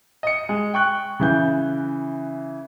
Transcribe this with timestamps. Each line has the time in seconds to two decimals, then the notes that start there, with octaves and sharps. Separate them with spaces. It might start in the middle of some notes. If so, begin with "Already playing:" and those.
0.23 D#5 C#7
0.49 G#3
0.74 G5 C#6 F#6
1.20 C#3 E3 G6